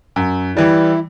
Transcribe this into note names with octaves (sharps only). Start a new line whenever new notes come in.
F#2
E3 G3 E4